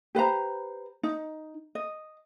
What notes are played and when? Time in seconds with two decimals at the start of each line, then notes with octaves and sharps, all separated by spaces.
0.15 G4 B4 C5 A#5
1.03 D#4
1.75 D#5